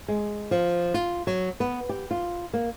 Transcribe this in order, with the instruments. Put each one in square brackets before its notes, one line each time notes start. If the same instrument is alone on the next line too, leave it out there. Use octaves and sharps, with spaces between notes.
[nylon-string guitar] G#3
F3
F4
F#3
B3
G4
F4
A#3